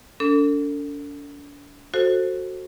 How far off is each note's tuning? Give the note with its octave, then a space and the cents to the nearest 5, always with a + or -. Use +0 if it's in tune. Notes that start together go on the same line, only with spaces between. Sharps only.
D4 -40 A4 +35
F#4 +0 A4 +15 C5 +15